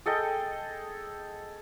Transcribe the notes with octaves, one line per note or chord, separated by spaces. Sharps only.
G#4 A4 D#5 G5